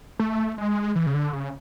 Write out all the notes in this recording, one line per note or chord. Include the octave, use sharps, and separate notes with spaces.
A3
G#3
E3
C#3
D3
C#3